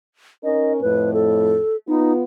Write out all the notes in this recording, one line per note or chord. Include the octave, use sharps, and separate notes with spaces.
C#4 D#4 A#4 D#5
F2 A2 B4
A4
B3 D#4 F4